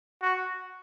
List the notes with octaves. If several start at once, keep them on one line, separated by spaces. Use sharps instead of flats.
F#4